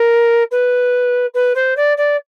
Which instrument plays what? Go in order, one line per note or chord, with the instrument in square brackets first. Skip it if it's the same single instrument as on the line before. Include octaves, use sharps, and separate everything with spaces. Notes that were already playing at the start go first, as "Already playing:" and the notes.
Already playing: [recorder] A#4
B4
B4
C5
D5
D5